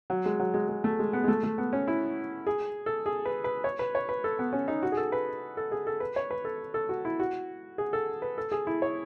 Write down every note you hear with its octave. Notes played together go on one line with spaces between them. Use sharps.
F#3
G#3
F#3
G#3
G#3
A3
G#3
B3
G#3
A3
A3
B3
C#4
E4
G#4
A4
G#4
B4
B4
C#5
B4
C#5
B4
A4
B3
C#4
D#4
F#4
G#4
A4
B4
A4
G#4
A4
B4
C#5
B4
A4
A4
F#4
E4
F#4
G#4
A4
B4
A4
G#4
E4
C#5